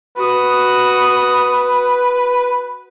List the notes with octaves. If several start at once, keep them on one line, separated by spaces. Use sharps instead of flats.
F#4 B4 D#6